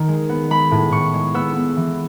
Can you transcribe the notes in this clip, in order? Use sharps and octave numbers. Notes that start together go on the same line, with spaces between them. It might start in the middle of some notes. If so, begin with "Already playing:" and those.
Already playing: D#3
G#3
B3
G#3 B5
A2
A2 C#6
G#3
B3 E6
B3
E3